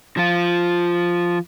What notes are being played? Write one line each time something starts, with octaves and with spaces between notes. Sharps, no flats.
F3 F4